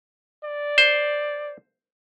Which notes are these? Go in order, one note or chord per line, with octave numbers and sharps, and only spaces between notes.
D5
C5